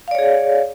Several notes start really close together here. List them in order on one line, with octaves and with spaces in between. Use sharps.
F5 D5 C#5 G#4